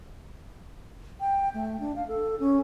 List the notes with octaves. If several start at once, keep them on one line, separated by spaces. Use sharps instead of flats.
G5
A3
D4
F5
A4
C#4